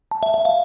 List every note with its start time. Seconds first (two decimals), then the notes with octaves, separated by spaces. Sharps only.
0.11 A5
0.23 E5
0.34 E5
0.45 F5